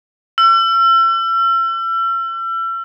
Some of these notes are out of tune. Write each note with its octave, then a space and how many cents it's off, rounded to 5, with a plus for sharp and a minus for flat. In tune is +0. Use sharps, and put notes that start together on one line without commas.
E6 +40